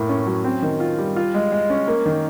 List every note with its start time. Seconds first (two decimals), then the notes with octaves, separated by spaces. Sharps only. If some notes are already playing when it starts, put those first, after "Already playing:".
Already playing: A2 A#3
0.09 C#4
0.27 F#3
0.44 C4
0.62 D#3
0.80 F4
0.98 G3
1.16 F4
1.34 G#3
1.52 G#3
1.70 C#4
1.88 A#3
2.06 D#3